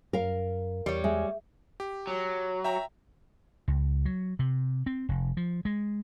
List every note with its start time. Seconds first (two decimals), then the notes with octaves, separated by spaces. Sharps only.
0.13 F#2 A#4 F5
0.86 E2 G3 C#5
1.04 G#3 E5
1.80 G4
2.07 F#3
2.64 E5 G5 A#5
3.68 C#2
4.05 F#3
4.39 C3
4.86 C4
5.09 F1
5.37 F3
5.65 G#3